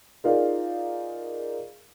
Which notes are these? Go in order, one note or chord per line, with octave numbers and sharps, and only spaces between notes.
D#4 F4 G#4 A#4 D5 F5